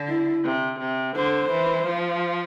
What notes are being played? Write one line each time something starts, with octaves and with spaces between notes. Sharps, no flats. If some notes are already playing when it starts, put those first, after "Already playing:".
Already playing: D3
E4
C3
C3
D3 C5
E3
F3